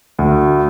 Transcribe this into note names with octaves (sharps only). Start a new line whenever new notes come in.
D2